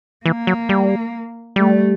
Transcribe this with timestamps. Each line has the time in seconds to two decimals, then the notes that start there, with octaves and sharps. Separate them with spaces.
0.25 E3 A#3
0.47 F#3
0.69 G3
1.56 G3 A3